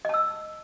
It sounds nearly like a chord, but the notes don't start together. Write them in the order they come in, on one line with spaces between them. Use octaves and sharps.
D#5 A5 E6